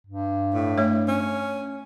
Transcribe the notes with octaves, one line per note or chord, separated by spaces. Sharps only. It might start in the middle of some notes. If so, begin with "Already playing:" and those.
G2
A2
A3 C#5
C#4